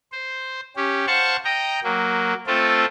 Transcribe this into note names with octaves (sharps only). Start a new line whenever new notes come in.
C5
C#4 G4
C5 F5 F#5 A5 C#6
D#5 G5 A#5
F#3 A#3
A3 C4 F4 A4